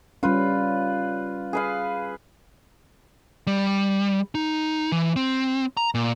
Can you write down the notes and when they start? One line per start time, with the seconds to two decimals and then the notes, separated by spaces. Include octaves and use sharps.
0.23 G3 C#4 F4 B4
1.53 G#4 B4 F5
3.47 G3
4.35 D#4
4.92 E3
5.16 C4
5.77 A#5
5.95 A#2